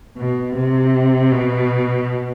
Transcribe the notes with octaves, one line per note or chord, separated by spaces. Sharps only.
B2
C3
B2